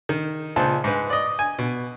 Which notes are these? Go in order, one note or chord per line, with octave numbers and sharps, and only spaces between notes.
D#3
C#2 A#2 C5 A5
G#2 B4
D5 D#5
G#5
B2